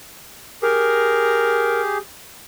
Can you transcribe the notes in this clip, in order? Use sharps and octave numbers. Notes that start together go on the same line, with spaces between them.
G4 G#4 A#4